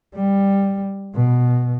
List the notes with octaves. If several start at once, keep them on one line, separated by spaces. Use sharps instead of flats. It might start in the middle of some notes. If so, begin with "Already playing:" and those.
G3
B2